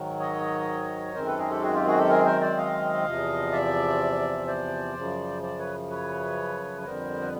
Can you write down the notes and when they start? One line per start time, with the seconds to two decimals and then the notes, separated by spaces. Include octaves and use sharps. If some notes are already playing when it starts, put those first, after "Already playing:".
Already playing: G#2 D#3 F#3
0.19 C#5 D#5
1.14 F#2 D#3 G#3 C4 A#4 C5
1.26 A4 B4
1.38 G#4 A#4
1.51 G4 A4
1.62 F#4 G#4
1.74 F4 G4
1.86 F#4 G#4
1.98 G4 A4
2.10 G#4 A#4
2.25 A#4 C5
2.41 C5 D5
2.57 D#5 F5
3.05 E2 C3 F3
3.52 D5 E5
4.47 C5 D5
4.95 F#2 C#3 F3
5.42 C5 D5
5.59 B4 C#5
5.90 B4 C#5
6.81 C#5
6.85 F2 D3 G3 B3 A#4 C5
7.21 B4